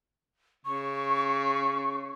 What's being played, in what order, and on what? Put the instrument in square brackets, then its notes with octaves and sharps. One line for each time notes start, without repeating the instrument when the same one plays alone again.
[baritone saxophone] C#3 [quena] C#6